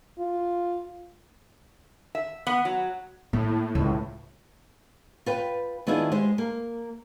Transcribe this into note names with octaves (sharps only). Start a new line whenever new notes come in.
F4
E5
B3
F#3
A2 A#3
C#2
F4 B4 G5
D#3 B3 D4 E4 F4 G#4
G#3 G4 C5
A#3